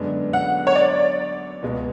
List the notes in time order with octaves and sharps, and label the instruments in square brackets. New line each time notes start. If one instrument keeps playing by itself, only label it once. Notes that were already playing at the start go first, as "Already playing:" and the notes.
Already playing: [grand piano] F#2 D3 G#3 B3 D4
[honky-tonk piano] F#5
C#5
D5
[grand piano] C#2 B2 G#3 B3